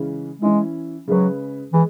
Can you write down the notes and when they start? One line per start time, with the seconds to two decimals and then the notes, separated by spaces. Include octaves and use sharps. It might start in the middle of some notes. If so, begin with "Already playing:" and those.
Already playing: C#3 E3 G#3 C#4
0.41 E3 G#3 C#4 E4
1.08 C#3 F#3 G#3 C#4 G#4 B4
1.73 E3 G#3